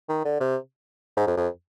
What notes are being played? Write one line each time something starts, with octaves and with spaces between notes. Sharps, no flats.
D#3
D3
C3
G#2
F2
F2